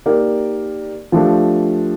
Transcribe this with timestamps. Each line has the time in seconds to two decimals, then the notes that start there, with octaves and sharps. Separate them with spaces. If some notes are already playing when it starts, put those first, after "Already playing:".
0.06 A#3 D#4 G4 A#4 D5
1.12 F3 A3 D4 G4